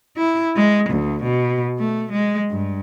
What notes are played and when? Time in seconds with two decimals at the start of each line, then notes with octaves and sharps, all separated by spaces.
0.17 E4
0.56 G#3
0.90 D2
1.23 B2
1.79 A3
2.12 G#3
2.51 G2